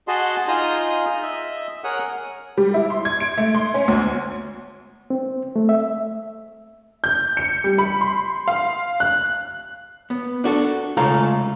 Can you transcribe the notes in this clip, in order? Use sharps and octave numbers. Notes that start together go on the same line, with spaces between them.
F#4 G#4 D#5 A5 C6
D#4 F4 G#4 A#5 D#6 G6
D#5 E5
G#4 A#4 C#5 F#5 D#6
G3
E4
C6
G#6
D7
A3
C6
C#4
D2
C4
A3
E5
G6
C#7
G3
B5
C6
F5
F#6
B3
D4 F#4 A4
C#3 G#3 A3 F4 A4 A#5